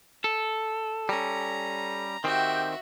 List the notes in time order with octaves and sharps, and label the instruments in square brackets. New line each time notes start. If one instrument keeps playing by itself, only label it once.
[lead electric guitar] A4
[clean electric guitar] G3 C#4 [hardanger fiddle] A#5
[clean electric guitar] D#3 C4 [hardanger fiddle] F#4 E5 [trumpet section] G4 G5